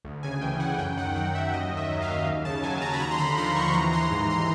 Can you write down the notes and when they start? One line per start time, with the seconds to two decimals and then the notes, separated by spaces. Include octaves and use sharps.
0.05 D2
0.23 C#3 G#5
0.41 E3 G5
0.60 D2 F#5
0.78 F#2 G5
0.97 D#3 F#5
1.16 F#3 F#5
1.34 F#2 E5
1.53 D#2 D#5
1.72 D#3
1.77 E5
1.90 F#3
2.02 F5
2.08 D#2
2.26 D#2
2.45 C#3 A5
2.63 F#3 G#5
2.82 D#2 A#5
2.93 B5
3.00 D#2 A#5
3.11 C6
3.18 D3 B5
3.37 F3 C6
3.56 D#2 C#6
3.74 E3 A#5
3.92 E3 C6
4.11 G#2 C6
4.29 G#2 C6